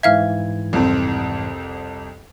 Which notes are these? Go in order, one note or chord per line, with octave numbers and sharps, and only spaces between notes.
G#2 E3 E5 F5 F6 G#6
C2 F2 C4